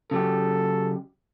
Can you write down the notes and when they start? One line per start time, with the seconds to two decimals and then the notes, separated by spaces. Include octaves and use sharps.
0.11 C#3 F#3 G4 A4